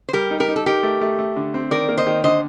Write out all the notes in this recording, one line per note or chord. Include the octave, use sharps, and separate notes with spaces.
C5
G3 G4 A#4
D#4
G4 A#4
D#4
A4
D#4 G4 A#4
A3
A3
A3
D3
C4
D#3 A#4 D5
A#3
C5 D#5
D#3
D3 C5 D#5